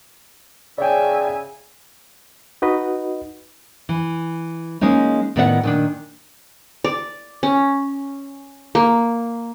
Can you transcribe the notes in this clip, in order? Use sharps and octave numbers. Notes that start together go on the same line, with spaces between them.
C#3 D5 E5 G5 G#5
D#4 F#4 B4 D#5
E3
G#3 A#3 C#4 D#4
A2 D#3 B3 D5 E5 F#5
A#2 D#3 D4
D5
C#4
A#3